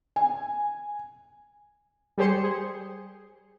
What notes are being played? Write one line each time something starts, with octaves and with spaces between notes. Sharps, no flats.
G#5
G3 G4 G#4 C5 C6 C#7
G#4